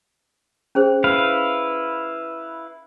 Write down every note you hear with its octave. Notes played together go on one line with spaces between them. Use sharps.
C#4 G#4 C5
E4 B4 F5